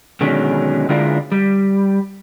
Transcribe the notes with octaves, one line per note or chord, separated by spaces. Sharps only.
B2 D3 D#3 F#3 G#3 C#4
D3 G#3 D4 E4 F4 A#4
G3